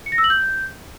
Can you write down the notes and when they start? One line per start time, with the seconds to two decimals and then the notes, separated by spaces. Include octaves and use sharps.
0.06 C#7
0.12 A#6
0.18 E6
0.24 F#7
0.30 G6